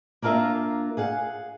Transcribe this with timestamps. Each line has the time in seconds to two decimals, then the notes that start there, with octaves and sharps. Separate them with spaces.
0.22 A#3 D4 F4 A#4 E5 F5
0.97 G#4 F5 F#5